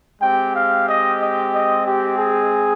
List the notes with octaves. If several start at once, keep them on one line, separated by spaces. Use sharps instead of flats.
G#3 C4 G4 G5
F5
D#5
D#5
D#5
G4
G#4